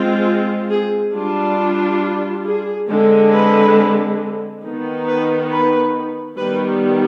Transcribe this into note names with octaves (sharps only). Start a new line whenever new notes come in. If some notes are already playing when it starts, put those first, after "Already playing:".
Already playing: G#3 C4 F4
G#4
G3 D4 F4
G#4
D3 G#3 C4
B4
D#3 B3 D#4
B4
B4
D#3 G3 B3 B4